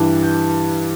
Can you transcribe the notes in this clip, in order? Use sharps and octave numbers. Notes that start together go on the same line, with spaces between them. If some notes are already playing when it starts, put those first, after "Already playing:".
Already playing: G2 E3 G3
G6